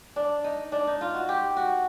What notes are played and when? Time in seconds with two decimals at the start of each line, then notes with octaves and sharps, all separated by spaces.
0.16 D4
0.44 D#4
0.72 D4
0.87 D#4
1.01 F4
1.14 F#4
1.29 G4
1.57 F#4